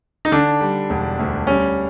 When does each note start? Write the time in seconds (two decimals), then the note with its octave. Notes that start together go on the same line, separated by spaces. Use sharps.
0.25 D#4
0.32 D3 D4
0.61 G3
0.90 E1
1.19 D2
1.47 G3 C#4